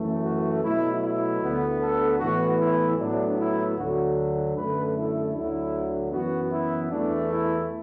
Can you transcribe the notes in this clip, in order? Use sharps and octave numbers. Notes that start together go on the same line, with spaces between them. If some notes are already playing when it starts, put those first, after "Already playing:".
Already playing: F#2 E3 A3
F#4
B2 F#3 A3 E4
E4
D2 D3 B3
A4
A2 E3 B3 F#4
E4
A2 F#3 B3 D4
E4
D2 D3 F#3 F#4
F#2 D3 A3 B4
E4
D2 D3 F#3 E4
F#2 E3 B3 F#4
E4
E2 E3 A3 D4
E4